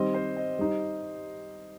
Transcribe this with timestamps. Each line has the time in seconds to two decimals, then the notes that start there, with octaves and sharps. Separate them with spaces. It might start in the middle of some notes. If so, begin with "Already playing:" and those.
Already playing: D#3 G3 C4 D#5
0.14 C5
0.37 D#5
0.59 G3 D#4 G4